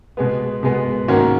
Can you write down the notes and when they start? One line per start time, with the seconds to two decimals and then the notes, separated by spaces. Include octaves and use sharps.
0.17 B2 G#3 B3
0.63 B2 G#3 B3
1.08 G#2 D#3 A#3 C#4 F#4